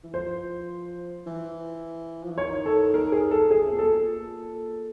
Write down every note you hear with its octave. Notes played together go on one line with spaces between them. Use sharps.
E3
F3 C5
E3
F3
E3
D#3 C#5
A4
A#4
G#4
A4
G#4
C3
A#2
B2 A4
A#2